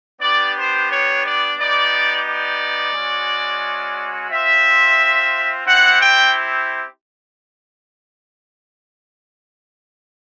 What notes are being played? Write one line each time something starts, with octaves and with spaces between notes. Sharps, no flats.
B3 D4 G4 D5
C5
C#5
D5
B3 D#4 G4 D5
D5
G#3 C#4 F#4
C4 F4 E5
C4 E4 G4 F#5
G5